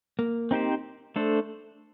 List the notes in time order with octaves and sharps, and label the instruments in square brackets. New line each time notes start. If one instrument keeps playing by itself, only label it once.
[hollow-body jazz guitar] A#3
[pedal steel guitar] C4 D#4 G4 C5
A3 D4 A4 C5